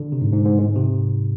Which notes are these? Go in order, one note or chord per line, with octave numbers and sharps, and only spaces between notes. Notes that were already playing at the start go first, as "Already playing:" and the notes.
Already playing: D3
C3
G#2
G#2
G#2
G#2
C3